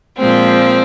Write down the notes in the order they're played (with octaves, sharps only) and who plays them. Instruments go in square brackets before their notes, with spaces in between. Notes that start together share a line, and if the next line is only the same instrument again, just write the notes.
[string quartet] A#2 F3 G#3 C4